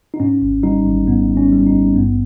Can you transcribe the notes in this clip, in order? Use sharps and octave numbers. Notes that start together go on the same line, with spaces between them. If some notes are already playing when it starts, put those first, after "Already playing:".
D#4
G#2 C#4
G#1
G3 D#4
G#1
G#2 B3
G#1
C#4
G3
D#4
G#1
G2 B3